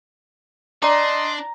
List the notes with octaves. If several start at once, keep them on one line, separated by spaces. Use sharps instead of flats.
D4 D5 D#5 A#5 C6 D6